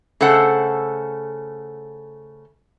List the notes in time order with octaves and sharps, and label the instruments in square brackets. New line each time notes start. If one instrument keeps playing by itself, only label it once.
[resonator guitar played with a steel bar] C#3 A3 A4 C5 F#5